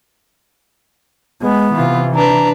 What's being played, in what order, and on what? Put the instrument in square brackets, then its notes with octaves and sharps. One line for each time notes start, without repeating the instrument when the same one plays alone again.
[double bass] G#3 [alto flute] B3
[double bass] C3 E3 [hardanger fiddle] F4
[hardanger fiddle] D4 B4 [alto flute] A#5